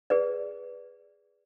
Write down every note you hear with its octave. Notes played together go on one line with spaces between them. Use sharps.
G#4 B4 D5